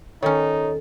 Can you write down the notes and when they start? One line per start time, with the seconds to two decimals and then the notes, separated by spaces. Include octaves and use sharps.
0.23 D#3 C#4 D#4 A4 C#5